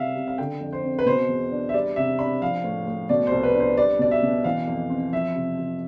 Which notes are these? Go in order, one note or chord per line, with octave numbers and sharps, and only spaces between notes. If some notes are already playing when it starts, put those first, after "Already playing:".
Already playing: C3 G3 E5 F5
C3
F5
D3 G5
F2
C5
C4
B4
B2 C5
E2
D4
E5
G3 D5
C3 E5
D4 B5
F3 F5
A2
A2
B2 D5
C2 C5
B4
D4
C5
G3 D5
B2 D5
E5
B2
E3 F5
F2
C4
F3 E5
C3
C3